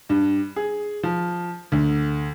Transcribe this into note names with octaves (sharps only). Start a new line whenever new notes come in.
G2
G#4
F3
D2